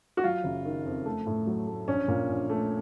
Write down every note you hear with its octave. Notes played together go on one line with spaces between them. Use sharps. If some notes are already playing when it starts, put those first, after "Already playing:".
F#4
F#3 F4
F#1
D#3
F2
A3
A2
F#3
A3
A#1 C#4
A#2
A#1
A3